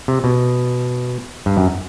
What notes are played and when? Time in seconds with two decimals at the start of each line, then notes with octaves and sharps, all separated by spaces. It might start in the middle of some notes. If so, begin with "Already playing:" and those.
0.08 C3
0.24 B2
1.46 G2
1.57 F#2